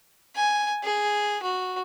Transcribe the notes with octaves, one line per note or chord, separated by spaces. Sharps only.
G#5
G#4
F#4